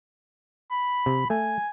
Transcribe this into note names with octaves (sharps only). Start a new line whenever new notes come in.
B5
C3
A3 G#5